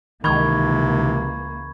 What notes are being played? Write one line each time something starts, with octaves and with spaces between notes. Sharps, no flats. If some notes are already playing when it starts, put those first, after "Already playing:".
C#2 C3 D#3 E3 A#3 B5 C#6 G#6